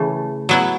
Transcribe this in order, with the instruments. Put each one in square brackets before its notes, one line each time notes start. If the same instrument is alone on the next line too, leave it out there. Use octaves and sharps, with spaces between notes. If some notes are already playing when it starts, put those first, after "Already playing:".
Already playing: [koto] C#3 E3 A3
F#3 B3 E4